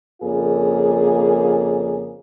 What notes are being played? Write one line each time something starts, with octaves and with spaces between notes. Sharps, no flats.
F2 C#3 A#3 F4 G#4